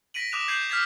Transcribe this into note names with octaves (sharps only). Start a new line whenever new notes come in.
A#6 B6 D7 D#7 F#7
D6 D#6 F#6 E7 F7
G6 G#6 C7 D#7 F#7
F6 G#6 A6 B6 F7